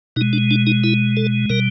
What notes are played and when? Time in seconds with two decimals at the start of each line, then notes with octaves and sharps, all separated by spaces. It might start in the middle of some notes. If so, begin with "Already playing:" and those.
0.16 B2 D#4
0.21 G#3
0.33 D4
0.51 D4
0.67 D#4
0.84 E4
1.17 A4
1.50 B2 G3 A#4